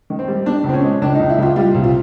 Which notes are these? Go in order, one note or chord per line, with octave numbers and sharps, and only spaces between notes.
D#3
C4
G3
B2 D4
C#2
C4
C#4
G#3
C#2 D4
C#2 D#4
E4
C#2 F4
G3 F4
C2
F4